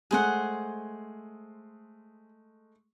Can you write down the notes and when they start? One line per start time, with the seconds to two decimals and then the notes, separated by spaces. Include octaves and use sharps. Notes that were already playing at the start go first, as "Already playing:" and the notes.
0.11 G#3 A3 G#4 C5 F#5